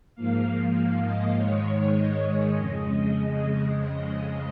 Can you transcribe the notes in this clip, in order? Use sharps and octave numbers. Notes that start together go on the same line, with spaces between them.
G#2 F3 A#3 F5
F5
D#5
G#2 D#3 G#3 C#5
D#5
D#5
F2 C#3 G#3